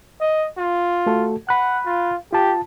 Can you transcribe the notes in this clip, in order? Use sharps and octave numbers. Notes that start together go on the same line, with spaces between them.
D#5
F4
A3 F#4 A4
F#5 B5 F#6
F4
F4 G4 A5